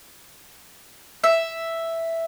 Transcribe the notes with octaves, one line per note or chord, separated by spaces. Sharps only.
E5